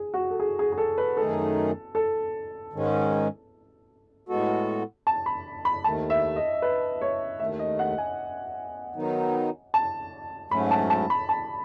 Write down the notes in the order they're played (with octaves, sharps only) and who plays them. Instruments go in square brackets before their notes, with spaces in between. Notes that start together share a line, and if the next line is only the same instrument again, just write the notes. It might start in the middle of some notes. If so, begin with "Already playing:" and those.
Already playing: [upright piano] G#4
F#4
A4
G#4
G#4
G#4
A4
B4
[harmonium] F#2 D#3 A3 D#4 G#4 [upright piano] A4
[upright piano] A4
[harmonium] G#2 D#3 G#3 C#4
A2 G#3 B3 F#4 A4
[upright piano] A5
B5
B5
[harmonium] D#2 D#3 A3 [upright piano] A5
[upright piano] E5
D#5
B4
C#5
[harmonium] D#2 D#3 A3 [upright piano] E5
[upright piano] D#5
F#5
G#5
[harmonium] D#3 F#3 B3 D#4
[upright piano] A5
[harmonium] G#2 F#3 A3 C#4 [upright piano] B5
[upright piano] A5
A5
B5
A5